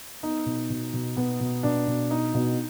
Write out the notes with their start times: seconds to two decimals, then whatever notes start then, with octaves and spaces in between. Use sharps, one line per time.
0.23 B3 D#4
0.46 B2
0.70 B2
0.93 B2
1.17 B2 B3
1.40 B2
1.63 B2 D4
1.87 B2
2.11 B3 D#4
2.34 B2